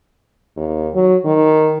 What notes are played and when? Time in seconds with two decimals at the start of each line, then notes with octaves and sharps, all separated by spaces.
0.56 D#2
0.94 F#3
1.25 D#3